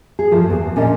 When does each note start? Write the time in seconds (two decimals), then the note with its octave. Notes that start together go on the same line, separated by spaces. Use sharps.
0.19 G#4
0.31 G2 F3 A3
0.49 E2 B3
0.61 D#2
0.76 A#2 C#4 D4 A#4 D#5